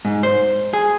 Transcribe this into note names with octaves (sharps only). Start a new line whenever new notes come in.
G#2
C5
G#4